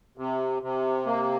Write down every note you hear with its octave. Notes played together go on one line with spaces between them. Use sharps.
C3
C3
A#3